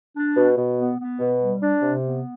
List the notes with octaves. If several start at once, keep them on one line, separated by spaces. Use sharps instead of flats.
D4
B2
B2
B3
B3
B2
G3
D4
C3
B3